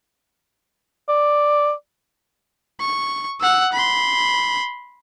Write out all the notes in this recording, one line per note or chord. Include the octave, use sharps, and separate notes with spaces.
D5
C#6
F#5 E6
B5 C6